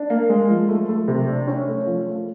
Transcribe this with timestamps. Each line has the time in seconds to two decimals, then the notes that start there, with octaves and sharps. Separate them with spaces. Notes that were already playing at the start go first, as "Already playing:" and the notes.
Already playing: D4
0.10 A#3
0.29 G#3
0.49 F3
0.69 A3
0.89 A3
1.08 C3
1.28 D4
1.47 C#4
1.68 A3
1.86 F3
2.07 A3